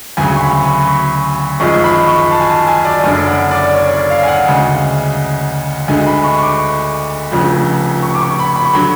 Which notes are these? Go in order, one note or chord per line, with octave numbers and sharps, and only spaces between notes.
D2 C#3 F#3 G#5
C#6
B5
B5
C#6
G#1 F#2 F3 G#3 C#6
B5
C#6
A5
G#5
A5
G#5
D5
F#1 F#2 D3 D5
F#5
D5
C#5
D5
F5
G#5
F#5
D2 C#3 G#3
D2 D3 G#3 G#5
B5
C#6
C#6
D6
F1 F2 C#3 F3
C#6
D6
C#6
B5
B5
C#6
D3 F#3 B5